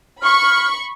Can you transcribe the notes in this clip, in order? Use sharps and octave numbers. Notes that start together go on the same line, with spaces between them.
B5 C#6 F6